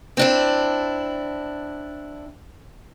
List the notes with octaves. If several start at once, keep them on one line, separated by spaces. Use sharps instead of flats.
C4 D4 E4